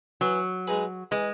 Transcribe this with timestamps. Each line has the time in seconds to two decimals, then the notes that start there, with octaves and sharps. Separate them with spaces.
0.21 E3 F#3
0.67 G#3 D#4 G#4 B4
1.11 E3 G#3